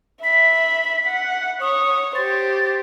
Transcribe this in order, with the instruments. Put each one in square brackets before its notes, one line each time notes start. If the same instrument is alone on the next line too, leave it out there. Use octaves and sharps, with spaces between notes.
[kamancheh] E5 B5 [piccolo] B6
[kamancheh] F#5
[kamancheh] C#5 [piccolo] D#6
[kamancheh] G4 C5 [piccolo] A6